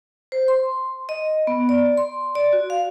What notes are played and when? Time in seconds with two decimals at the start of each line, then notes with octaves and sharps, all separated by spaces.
0.32 C5
0.48 C6
1.09 D#5
1.47 B3
1.69 D5
1.97 C6
2.35 D5
2.53 F#4
2.70 F5